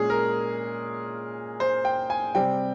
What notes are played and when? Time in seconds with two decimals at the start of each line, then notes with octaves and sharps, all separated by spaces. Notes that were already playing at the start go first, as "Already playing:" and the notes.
Already playing: A#2 G#3 C#4 G#4
0.10 A#4
1.60 C5
1.85 G5
2.10 G#5
2.35 C3 G3 C4 G5